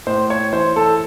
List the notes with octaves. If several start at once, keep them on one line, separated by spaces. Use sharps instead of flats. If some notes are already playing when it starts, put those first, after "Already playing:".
A2 C5
C#5
E3 C5
A4